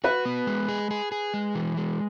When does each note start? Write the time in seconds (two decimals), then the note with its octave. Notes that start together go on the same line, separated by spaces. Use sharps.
0.04 F#4 B4
0.25 B3
0.47 G#3
0.68 G#4
0.91 G#4
1.12 G#4
1.34 G#3
1.55 E3
1.77 G#3